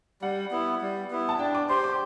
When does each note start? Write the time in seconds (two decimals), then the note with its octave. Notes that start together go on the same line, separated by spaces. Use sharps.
0.22 G3 F#5
0.51 B3 E4
0.81 G3
1.11 B3 E4
1.29 A5
1.39 D4 G5
1.55 D6
1.69 G4 C5 C6
1.84 D6